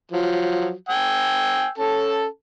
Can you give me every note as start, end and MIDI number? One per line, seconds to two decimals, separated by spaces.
0.12 0.72 53
0.12 0.72 54
0.89 1.69 79
0.89 1.69 80
0.89 1.69 88
1.78 2.25 61
1.78 2.25 69
1.78 2.25 81